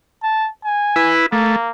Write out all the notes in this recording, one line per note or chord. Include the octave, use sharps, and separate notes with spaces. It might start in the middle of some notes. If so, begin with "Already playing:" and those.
A5
G#5
E4 B4
A3 A#3